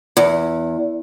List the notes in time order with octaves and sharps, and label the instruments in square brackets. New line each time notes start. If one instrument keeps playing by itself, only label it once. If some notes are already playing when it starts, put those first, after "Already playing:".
[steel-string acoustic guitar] E2